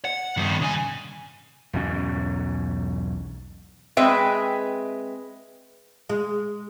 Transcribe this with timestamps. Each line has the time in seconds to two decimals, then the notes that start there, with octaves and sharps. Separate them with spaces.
0.05 F#5
0.37 G2 D#3
0.61 C#3 G#5
1.73 B1 E2 G#2 C#4
3.97 G#3 C4 B4 E5 G5
6.09 G#3